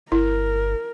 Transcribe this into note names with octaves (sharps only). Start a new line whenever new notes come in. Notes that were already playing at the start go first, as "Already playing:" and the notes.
G1 E4 A#4